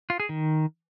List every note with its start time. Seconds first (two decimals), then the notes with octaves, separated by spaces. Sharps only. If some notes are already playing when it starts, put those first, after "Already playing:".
0.10 F4
0.20 G#4
0.29 D#3